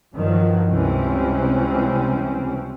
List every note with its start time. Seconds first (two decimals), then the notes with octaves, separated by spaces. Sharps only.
0.14 G2 D#3 F3 F#3
0.69 C#2 C3 E3 G3 C4 C#4